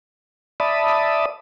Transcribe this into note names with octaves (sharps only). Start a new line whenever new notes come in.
D5 E5 A5 B5 D#6